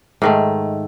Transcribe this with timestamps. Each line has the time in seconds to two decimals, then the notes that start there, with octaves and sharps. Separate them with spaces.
0.22 G#2 D#3 A3